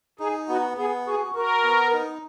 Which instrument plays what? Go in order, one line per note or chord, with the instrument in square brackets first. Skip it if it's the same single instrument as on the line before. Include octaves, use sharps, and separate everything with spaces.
[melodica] D#4 [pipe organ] G#4
[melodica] B3 [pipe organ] F#4
[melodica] B3 [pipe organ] G#4
[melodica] F#4 [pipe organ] G#4
[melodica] F#4 [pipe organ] A#4
[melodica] B3
D#4